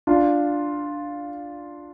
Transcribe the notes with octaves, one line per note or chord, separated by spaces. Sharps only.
D4 F4